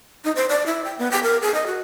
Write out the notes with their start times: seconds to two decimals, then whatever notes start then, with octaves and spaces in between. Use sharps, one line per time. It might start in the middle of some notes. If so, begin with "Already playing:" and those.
0.24 D#4
0.36 C5
0.49 D5
0.66 E4
0.85 G5
0.99 B3
1.11 G5
1.23 A#4
1.42 G#4
1.54 D#5
1.67 F#4